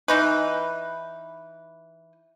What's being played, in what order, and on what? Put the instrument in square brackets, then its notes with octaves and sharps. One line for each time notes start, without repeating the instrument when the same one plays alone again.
[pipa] E3 D#4 B4